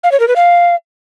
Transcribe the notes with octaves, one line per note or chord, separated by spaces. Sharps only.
F5
C#5
A#4
B4
F5